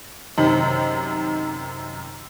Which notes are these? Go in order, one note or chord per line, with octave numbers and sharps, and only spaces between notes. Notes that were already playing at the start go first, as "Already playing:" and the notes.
F#2 C3 D#3